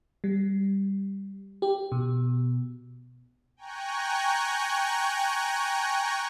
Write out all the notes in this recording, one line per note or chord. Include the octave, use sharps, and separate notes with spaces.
G3
G4
B2
G5 G#5 A#5 C#6 F#6